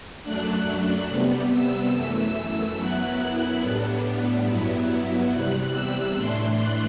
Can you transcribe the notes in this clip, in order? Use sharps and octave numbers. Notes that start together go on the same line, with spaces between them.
F#2 F#3 A3 D4 F#6
C3 G3 B3
E6
F#2 E3 A3 E6
F#2 F#3 B3 E4 F#6
A2 G3 B3 D4
G2 F#3 B3 E4
E2 C3 G3 F#6
E6
A2 E3 A3 D4 C6
F#6